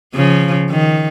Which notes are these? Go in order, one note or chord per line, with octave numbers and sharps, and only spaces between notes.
C#3 F3
D#3